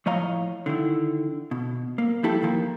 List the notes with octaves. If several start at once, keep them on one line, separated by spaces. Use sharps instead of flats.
A2 F3 C#5 D#5 F5 A#5
D3 D#3 E4
B2
A#3
F3 G3 E4 G4 A4
D#3 F3 A#3